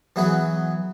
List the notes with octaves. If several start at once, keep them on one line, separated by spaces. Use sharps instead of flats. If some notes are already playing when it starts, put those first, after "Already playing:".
E3 F#3 B3 G#4 B4